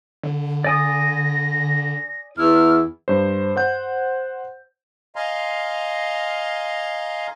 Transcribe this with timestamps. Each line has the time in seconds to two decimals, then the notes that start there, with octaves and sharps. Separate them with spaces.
0.23 D3
0.64 D5 G#5 D#6 A#6
2.37 E2 E4 F6
3.08 G2 C5
3.56 C5 F#5 G6
5.16 D#5 F5 G#5 A#5 C6